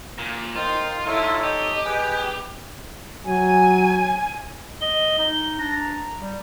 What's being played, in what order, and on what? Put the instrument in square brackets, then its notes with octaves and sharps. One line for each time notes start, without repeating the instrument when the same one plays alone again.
[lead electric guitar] A#2
[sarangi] D#4 [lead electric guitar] F4 [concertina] A#4 C5 G5
[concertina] D#4 A4 C#5 [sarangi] E4
[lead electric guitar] G4 [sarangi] D#5
[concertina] G#4 B4 G#5
[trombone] F#3 [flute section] G#5
[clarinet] D#5 [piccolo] G7
[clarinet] D#4
[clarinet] D4 [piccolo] A#6
[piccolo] A#5
[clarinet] G3